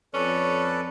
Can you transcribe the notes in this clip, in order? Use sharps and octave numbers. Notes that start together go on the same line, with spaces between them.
F2 C#4 A4 B4 D5